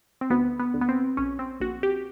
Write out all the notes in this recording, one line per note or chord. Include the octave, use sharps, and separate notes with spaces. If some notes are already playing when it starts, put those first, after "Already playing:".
C4
D2 B3
B3
D2
B3
C4
A#1 C#4
C4
A#1 F#4
G4